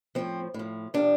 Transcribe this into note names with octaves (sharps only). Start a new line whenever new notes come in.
A2 F3 C4
A2 F3
C3 F3 D4